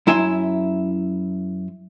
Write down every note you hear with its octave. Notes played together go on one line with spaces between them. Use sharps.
F#2 E4 E5 G#5 C6